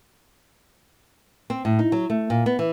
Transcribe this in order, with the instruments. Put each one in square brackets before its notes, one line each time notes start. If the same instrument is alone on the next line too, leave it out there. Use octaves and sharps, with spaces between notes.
[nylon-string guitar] C4
A2
D#4
F#3
A3
A#2
B3
E3